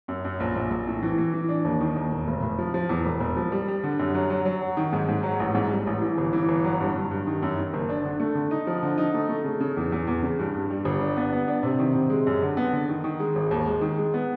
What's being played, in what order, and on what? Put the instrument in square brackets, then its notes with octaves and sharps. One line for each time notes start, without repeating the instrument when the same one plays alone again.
[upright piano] F#2
F#2
A#1
A#1
A#1
A2
E3
E3
E3
D4
D#2
D#3
D#2
E1
F1
F1
F3
F3
E2
E1
E1
F3
G3
G3
D3
F#2
F#3
F#3
F#3
F#3
D#3
G#2
G#2
F#3
A1
G#2
G3
A1
E3
G1
E3
G1
F#3
G2
G2
G2
D#3
F#2
D#3
F#1
D4
D3
A3
D3
D#4
F3
D3
D#4
A3
A3
C#3
C#3
E2
E2
E2
C#3
G2
G2
G3
G1
D4
B3
B3
D4
C3
D#3
C3
G#3
F#2
D3
B3
D3
D#3
D#3
G#3
G#1
D#2
G#3
D#3
G#3
B3